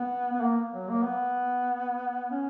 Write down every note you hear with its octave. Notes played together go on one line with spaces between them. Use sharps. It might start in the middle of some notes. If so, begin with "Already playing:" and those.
Already playing: B3
B3
A#3
F#3
A#3
B3
C#4